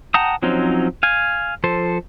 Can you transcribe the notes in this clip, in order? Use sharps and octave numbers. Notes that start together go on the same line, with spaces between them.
F#5 G5 A5 A#5 D#6
F3 F#3 C4 C#4 D#4
F5 G#5
F3 A4 C5